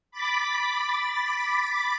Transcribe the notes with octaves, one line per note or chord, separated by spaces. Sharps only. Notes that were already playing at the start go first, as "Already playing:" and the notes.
B5 D6 A6 B6